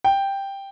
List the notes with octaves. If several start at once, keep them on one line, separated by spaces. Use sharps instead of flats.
G5